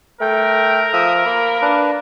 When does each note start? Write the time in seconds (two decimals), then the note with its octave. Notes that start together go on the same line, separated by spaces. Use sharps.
0.21 A3 A#4 G5
0.93 F3 E5 D#6
1.26 A#3 B5
1.62 D4 B4